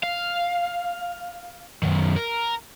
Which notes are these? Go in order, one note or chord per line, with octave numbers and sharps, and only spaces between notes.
F5
F#2 D#3
A#4